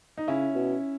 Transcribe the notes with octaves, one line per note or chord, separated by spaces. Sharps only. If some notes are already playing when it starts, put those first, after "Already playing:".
D#4
C#3 C#4 E4
B2